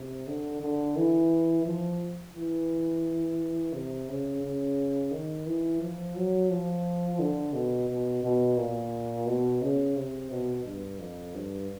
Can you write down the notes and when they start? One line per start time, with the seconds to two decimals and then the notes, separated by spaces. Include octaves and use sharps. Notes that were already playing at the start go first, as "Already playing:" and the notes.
Already playing: C3
0.27 D3
0.62 D3
0.96 E3
1.65 F3
2.34 E3
3.73 C3
4.09 C#3
4.42 C#3
5.11 D#3
5.46 E3
5.80 F3
6.16 F#3
6.50 F3
7.19 D3
7.53 B2
7.89 B2
8.23 B2
8.57 A#2
9.26 B2
9.61 C#3
9.96 C3
10.31 B2
10.64 G2
10.99 F2
11.35 G2